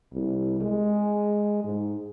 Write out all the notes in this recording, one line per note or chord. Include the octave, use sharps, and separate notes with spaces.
C2
G#3
G#2